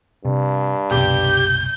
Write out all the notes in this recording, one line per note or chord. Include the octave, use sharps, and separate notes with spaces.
G2 C3
F#1 C2 B2 G4 G6